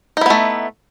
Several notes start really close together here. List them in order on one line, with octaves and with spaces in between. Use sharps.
D#4 E4 B3 A3